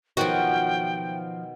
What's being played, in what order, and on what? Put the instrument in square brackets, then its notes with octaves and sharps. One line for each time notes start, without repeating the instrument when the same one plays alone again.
[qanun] B2 D#3 F#3 [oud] F3 F#4 [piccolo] G5